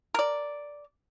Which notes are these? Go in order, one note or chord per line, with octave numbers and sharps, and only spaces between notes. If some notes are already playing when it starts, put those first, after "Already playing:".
A#4 D5